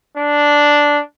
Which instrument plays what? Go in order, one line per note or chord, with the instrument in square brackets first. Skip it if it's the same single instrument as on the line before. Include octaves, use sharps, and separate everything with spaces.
[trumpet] D4